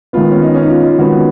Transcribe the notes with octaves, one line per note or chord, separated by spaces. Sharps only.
D#3 G#3 B3 F4
C#4
D#4
C#4
D#4
F4
D#3 G#3 B3 F#4